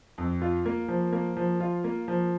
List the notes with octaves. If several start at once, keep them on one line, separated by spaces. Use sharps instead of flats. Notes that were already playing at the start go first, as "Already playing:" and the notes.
F2
F4
A#3
F3
A#3
F3
F4
A#3
F3